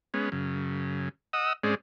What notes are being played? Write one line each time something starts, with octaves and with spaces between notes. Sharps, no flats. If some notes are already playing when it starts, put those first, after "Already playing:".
G#3 B3 C#4
F#2 C#3
D#5 F#5 D#6 E6
G#2 G#3 C4 C#4 G#4 D5